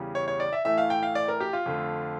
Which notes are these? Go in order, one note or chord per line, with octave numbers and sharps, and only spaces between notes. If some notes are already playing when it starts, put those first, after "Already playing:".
Already playing: E2 C#3 G3
C#5
C#5
D5
E5
A2 E3 A3 E5
F5
G5
F5
D5
A#4
G4
F4
F2 D3 A3